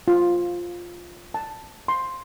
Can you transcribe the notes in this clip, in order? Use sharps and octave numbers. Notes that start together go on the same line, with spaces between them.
F4
A5
C6